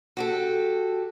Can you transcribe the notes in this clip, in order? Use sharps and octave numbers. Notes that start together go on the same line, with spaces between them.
F#4 G4 A4